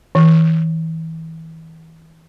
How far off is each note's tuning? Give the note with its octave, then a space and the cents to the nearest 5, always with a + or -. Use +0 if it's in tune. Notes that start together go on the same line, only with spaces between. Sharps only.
E3 -30